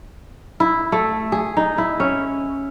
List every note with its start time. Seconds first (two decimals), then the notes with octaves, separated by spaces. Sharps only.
0.60 E4
0.92 A3
1.32 G#4
1.57 D#4
1.78 E4
2.00 C#4